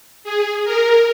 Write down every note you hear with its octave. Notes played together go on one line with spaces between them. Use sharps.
G#4
A#4